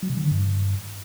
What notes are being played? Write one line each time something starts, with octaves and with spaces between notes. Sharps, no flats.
F#3
C3
D#3
D3
G2